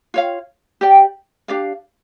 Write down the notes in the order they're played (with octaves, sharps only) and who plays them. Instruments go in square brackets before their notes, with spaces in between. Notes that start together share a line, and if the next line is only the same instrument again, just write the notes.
[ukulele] F4 C#5 F5
G4 D5 G5
D4 G4 D5 F5